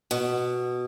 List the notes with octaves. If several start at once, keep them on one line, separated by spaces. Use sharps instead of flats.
B2